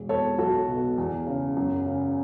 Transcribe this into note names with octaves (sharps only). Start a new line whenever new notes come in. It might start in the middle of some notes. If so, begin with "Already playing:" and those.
Already playing: E1
E2 A4 C#5
B1 F#4 A4
B2
E2
C#3
F#2
C#3